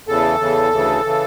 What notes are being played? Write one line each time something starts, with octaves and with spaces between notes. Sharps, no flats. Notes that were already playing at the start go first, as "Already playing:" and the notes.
E2 C#3 E3 A4
E2 C#3 E3
D2 C#3 E3
C#3 E3